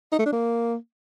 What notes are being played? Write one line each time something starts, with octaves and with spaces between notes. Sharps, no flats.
D#4
A3
D4
A#3